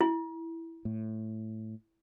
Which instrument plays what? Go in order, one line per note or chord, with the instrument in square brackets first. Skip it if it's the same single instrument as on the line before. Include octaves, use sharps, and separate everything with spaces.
[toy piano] E4
[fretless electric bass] A2